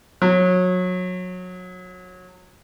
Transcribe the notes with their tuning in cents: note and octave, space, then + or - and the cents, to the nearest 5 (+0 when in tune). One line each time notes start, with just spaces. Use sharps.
F#3 -25